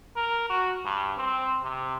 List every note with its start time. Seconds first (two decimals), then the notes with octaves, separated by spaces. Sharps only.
0.16 A#4
0.50 F#4
0.85 G2
1.18 C4
1.63 C3